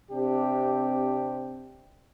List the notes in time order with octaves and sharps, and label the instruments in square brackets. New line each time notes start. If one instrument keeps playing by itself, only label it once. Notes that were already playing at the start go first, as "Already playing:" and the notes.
[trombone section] C3 C4 D4 G4